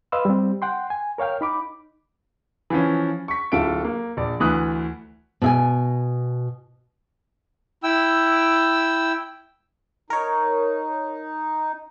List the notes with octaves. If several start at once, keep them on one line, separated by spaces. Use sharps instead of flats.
B4 D#5 F5 B5 C6 E6
G3 C4
F#5 G5 C6
G#5
A#4 C#5 F5 G5 F6
D#4 B5 D6
E3 F3 C#4
C#6 B6
D1 F4 A4 E5 D7
A#3
A#1 D5
D2 E3 D#6 F#6
B2 E5 G#5
E4 G5 E6
D#4 A#4 C#5